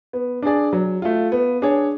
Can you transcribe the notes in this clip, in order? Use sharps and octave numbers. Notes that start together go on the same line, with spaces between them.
B3
D4 G#4 D5
F#3
A3 F4
B3
D4 G#4 C#5